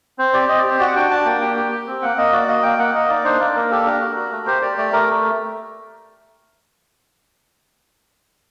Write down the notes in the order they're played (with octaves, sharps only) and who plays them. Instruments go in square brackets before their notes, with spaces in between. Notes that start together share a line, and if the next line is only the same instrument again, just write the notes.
[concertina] C4 C5
G4 D5
C4 D#5
D5
G4
C5
F#4 D5
F#5
D4 G5
D4 A5
A#3 G5
G4 G5
G4
G4
C4
A#3 F#5
A#3 D#5
F#4 D5
A#3 D#5
A#3 G5
A#3 F#5
A#3 D#5
D#4 D5
D4 C5
A#3 D5
A#3 A#4
G4 A4
D4 A#4
F#4
F#4
A3
G4 C5
G4 D5
A3 D5
A3 A#4